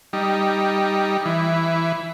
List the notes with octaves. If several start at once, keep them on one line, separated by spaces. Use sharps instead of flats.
G3 D#4
E3